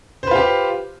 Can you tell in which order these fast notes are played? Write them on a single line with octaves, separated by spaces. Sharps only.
C5 B4 F4 G4